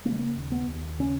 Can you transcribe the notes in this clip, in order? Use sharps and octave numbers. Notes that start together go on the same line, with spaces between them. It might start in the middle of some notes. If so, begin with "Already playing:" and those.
C#3 A#3
G#3
A#3
D#2
B3
D#2
C#3 C#4